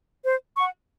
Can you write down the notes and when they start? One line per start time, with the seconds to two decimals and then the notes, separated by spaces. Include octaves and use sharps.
0.25 C5
0.55 F#5 C#6